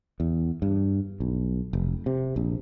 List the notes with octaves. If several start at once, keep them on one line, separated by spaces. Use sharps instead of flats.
E2
G2
B1
F1
C3
A#1